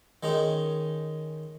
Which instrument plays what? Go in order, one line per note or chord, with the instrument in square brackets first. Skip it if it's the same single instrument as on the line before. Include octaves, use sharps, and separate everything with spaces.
[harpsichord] D#3 G#3 C#4 D#4